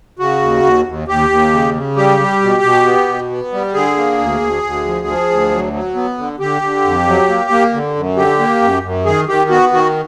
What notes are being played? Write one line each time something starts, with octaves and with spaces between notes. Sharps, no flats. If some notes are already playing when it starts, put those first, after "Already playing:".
C#3 F#4
D#2
D#2
D#2
D#2 G4
D#2
C#3
C#3
G3 G4
G3
B2
B2
B3
B2
B3
G3
D3 G#4
A#3
D2
D2
D2
F3
F3
D2
F#3
F#3
B3
D3
D3 G4
D3
F2
F#3
A#3
A#3
D3
F#2
D3 G4
A#3
F#2
F#2
D#3 G#4
D#3 G4
B3 F#4
D#3 F#4